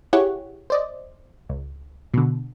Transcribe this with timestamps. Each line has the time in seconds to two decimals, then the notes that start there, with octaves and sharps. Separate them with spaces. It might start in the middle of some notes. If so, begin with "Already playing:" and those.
0.13 E4 G4 G#4 C#5 F#5
0.70 C5 D5 D#5
1.49 C#2
2.14 B2 D3